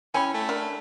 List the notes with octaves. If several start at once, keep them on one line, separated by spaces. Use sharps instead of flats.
C#4 E4 G4 G#5 B5
A3
D4 A#4